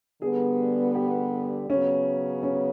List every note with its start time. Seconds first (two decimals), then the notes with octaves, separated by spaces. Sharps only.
0.21 D3 G3 B3 G#4
0.95 G4
1.69 C#3 F#3 B3 C#4
2.43 C#4